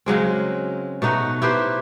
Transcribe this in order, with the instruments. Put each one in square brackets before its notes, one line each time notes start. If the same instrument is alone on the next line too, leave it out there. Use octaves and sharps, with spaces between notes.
[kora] C#3 F#3 G#3 C4
B2 A3 D#4 F#4
E4 G4 B4 C5